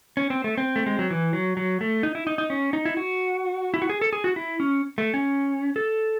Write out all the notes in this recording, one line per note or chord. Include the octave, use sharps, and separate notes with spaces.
C#4
C4
A3
C4
A3
G#3
F#3
E3
F#3
F#3
A3
D#4
E4
D#4
D#4
C#4
D#4
E4
F#4
E4
F#4
G#4
A4
G#4
F#4
E4
C#4
A3
C#4
A4